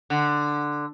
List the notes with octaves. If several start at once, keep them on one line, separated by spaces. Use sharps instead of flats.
D3